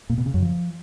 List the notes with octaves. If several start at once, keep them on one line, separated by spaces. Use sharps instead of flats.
A#2
B2
C#3
F#2
F3